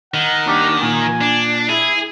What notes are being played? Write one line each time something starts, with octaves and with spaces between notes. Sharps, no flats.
D#3 F#5
D#2 D4 G4
A#2 G#5
D4
E4 G#4